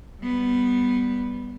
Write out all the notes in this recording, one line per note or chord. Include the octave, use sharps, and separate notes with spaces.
G3 B3